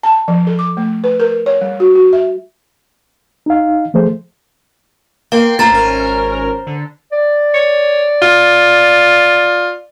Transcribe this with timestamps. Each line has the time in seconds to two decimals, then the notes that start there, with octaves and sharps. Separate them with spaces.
0.03 A5
0.28 F3
0.47 A4
0.59 D6
0.77 A3
1.04 B4
1.20 A#4
1.46 C#5
1.61 G3
1.80 F#4
1.95 F#4
2.13 E5
3.46 D#4 F5
3.94 F3 A3 G#4 A4 C5
5.32 A#3 F5 G5 C6
5.59 A3 A#3 F4 C5 A#5 A6
5.71 G#1 C#4 A#4
6.67 D3
7.12 D5
7.54 C#5
8.22 F4